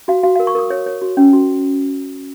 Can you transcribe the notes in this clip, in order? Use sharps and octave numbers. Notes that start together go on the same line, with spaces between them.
F#4 F5
F#4 F5
A#4 F5
C#6
A#4 D#6
C#5
C#5
F#4
C#4
F#4